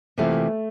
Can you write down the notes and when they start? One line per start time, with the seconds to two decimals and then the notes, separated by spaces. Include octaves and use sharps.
0.18 C3 E3 A3 A#3 F4